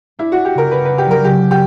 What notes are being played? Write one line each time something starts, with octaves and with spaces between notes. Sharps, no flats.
D4 E4
D4 F#4
G4
C#3 A#4
D4 B4
D4 B4
G4
F#3 A#4
C#3 G4
D4
G4